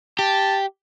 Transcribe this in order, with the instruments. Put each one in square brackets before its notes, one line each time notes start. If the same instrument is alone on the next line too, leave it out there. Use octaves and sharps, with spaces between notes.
[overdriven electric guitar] G4 [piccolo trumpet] A5